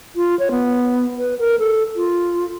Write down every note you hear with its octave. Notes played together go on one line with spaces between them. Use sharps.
F4
C#5
B3
B4
A#4
A4
F4